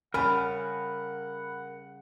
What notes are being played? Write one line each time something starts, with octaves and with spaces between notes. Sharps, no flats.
C#3 G3 C#4 A#4 F#5 G#5 B5